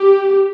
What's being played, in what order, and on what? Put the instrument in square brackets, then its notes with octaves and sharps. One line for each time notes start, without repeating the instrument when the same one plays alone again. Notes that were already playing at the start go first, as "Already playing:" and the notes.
Already playing: [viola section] G4